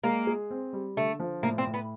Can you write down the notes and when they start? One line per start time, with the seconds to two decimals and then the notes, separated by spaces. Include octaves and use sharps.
0.04 G#3 A#3
0.27 G#4
0.50 C4
0.73 G3
0.97 D3 A3
1.20 F3
1.43 A2 A#3
1.58 C4
1.66 A2
1.74 B3